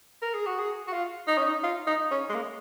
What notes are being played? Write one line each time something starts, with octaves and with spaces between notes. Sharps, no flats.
A#4
G#4
F#4
G#4
F#4
F4
D#4
C#4
D#4
F4
D#4
C#4
G#3
A#3